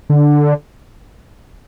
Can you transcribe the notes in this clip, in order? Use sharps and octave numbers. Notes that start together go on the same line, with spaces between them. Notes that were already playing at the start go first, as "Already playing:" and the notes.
D3